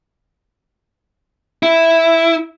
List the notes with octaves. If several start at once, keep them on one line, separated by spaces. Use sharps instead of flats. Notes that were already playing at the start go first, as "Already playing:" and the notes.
E4